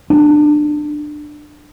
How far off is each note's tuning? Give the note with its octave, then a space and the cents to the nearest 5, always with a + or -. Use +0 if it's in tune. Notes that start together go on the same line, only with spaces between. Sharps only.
D4 +25